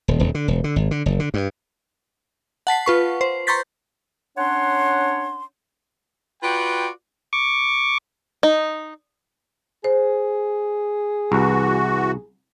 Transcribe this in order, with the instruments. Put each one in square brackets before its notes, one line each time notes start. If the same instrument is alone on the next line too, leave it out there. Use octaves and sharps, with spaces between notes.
[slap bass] D#1
D#1
D3
E1
D3
G#1
D3
F#1
D3
G2
[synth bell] F#5 A5 B6 C7
F4 B4 C#6
C5
A#5 C6 C#6 G6 A6 B6
[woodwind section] C#4 D4 C#5 F#5 C6
[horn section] F4 F#4 B4 D5 G5
[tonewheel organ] C#6 D6
[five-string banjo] D#4
[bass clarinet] G#4 [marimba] C5
[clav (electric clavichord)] C2 [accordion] E3 F#4